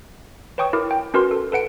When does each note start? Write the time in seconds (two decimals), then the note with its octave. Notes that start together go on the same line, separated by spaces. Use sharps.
0.58 B4 C#5 G5 C#6 D#6
0.73 E4 A#4 D6
0.91 G5
1.14 C#4 F#4 A#4 B4 C6
1.31 A4
1.52 A4 B4 F#5 D7